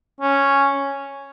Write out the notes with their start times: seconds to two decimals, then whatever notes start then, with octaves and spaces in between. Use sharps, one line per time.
0.20 C#4